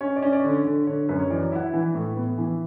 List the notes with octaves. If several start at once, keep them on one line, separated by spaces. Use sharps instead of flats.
C#4 C#5
D5
C#4
D5
D3
C#5
D3
D3 C#5
F#2 B4
C#5
E3 D5
E4 F#5
E5
E3
A2
B3
E3